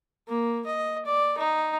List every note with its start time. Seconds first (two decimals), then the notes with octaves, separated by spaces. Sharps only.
0.28 A#3
0.66 D#5
1.05 D5
1.38 D#4